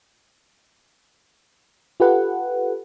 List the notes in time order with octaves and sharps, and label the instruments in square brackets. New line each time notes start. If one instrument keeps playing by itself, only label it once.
[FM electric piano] F4 G4 A4 B4 F#5